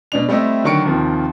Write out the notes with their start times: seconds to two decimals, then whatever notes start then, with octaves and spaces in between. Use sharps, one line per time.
0.12 B2 D4 F7
0.29 G3 A3 C4 E4 D#5
0.64 D3 D#3 F#3 C#6 C#7 D7
0.85 D#2 C3 D#3 F3